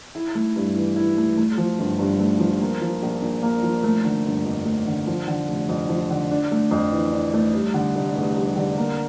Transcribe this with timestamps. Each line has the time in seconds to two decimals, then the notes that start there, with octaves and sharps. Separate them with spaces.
0.15 E4
0.35 A3
0.56 G2
0.75 E3
0.96 E4
1.17 A3
1.37 A3
1.58 F3
1.79 G1
1.99 G2
2.19 A3
2.40 F3
2.61 A#3
2.82 F3
3.03 A#1
3.22 A#2
3.43 A#3
3.63 F3
3.83 A3
4.05 D3
4.25 G1
4.45 F2
4.66 A3
4.87 D3
5.07 F3
5.28 D3
5.48 F1
5.69 F2
5.89 F3
6.11 D3
6.31 D4
6.51 A3
6.71 F2
6.92 E3
7.12 D4
7.33 A3
7.54 G3
7.74 D3
7.95 F1
8.16 E2
8.36 G3
8.56 D3
8.77 A#3